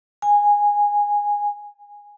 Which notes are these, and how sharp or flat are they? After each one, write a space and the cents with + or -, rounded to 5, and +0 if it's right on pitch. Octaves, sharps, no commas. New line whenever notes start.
G#5 -10